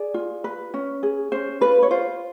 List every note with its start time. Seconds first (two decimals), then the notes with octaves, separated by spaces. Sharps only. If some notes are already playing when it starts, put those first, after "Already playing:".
Already playing: G#4 D5
0.14 F4
0.44 B4
0.74 C#4
1.03 G#4
1.32 C#4 C5
1.61 F4 B4
1.82 C#5
1.90 F4 C5